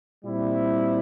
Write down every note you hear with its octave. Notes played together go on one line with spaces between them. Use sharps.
A#2 G3 C4 E4